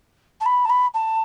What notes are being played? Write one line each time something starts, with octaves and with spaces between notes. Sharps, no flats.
A5
B5
A5
B5
A5